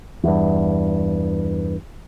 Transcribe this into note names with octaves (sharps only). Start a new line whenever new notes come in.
E2 G2